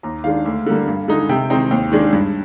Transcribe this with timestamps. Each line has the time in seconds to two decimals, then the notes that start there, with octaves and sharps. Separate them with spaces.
0.03 D#2 A#5
0.24 D#3 G#3 D4 F5
0.45 D2
0.66 D3 G3 A#3
0.88 G2
1.08 D3 G#3 D#4
1.29 C3 G5
1.50 D#3 G#3 C4 D#4 G5
1.71 D#2 G5
1.92 D#3 G#3 D4
2.13 G2